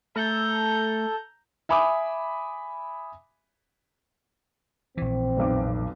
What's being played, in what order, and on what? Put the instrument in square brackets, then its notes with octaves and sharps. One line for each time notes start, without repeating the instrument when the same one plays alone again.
[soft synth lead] A3 [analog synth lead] A4 [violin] A#5 G6
[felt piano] E5 G#5 B5 D6 D#6
[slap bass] A#1 E3 [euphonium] C4
[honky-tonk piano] F1 B1 D6